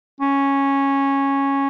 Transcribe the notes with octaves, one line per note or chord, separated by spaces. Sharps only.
C#4